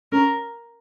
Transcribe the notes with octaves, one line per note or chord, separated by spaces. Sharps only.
C#4 A#4